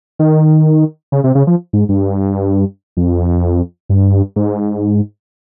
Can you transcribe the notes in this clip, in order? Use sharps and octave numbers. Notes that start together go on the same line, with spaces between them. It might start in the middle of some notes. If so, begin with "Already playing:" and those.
D#3
C#3
C3
C#3
F3
G#2
G2
F2
G2
G#2